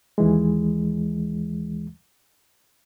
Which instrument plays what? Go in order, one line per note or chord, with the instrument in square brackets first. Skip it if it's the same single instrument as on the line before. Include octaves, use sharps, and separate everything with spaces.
[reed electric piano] D#2 E3 G#3